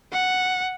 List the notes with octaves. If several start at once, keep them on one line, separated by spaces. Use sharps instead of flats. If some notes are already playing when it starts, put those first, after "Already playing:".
F#5